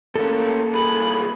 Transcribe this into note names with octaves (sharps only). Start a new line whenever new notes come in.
A2 A#3 C#4 A4
C2 G#4 B5